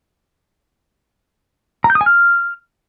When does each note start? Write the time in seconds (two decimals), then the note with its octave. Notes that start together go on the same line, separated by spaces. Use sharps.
1.84 A#5
1.90 G6
1.95 D#6
2.01 G#5
2.06 F6